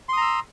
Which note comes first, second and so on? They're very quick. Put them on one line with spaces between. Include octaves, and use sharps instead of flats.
C6 D#6 A#5 E6